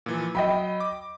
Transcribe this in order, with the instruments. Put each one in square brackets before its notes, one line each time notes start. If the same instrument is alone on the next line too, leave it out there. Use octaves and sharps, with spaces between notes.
[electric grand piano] A#2 E3 F3
[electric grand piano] F#3 [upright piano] D#5 G5 B5
[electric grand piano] D6